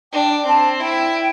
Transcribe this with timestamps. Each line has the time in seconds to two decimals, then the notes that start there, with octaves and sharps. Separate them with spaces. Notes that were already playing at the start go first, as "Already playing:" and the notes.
0.12 D4 G5
0.46 C4 A5
0.80 E4 G5